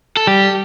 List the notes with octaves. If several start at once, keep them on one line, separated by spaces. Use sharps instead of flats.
A4
G3 G4